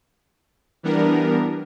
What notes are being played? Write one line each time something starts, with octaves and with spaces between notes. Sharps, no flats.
E3 G3 B3 D4 A#4